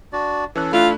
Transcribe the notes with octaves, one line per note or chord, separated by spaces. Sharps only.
D4 F#4 D5
E3 C#4 A4 F#6
A3 D4 E4 F4 B5